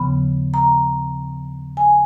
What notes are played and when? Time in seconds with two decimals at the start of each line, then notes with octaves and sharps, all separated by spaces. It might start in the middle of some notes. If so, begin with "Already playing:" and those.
Already playing: D#2 C#3 F3 B3 B5
0.54 A#5
1.77 G#5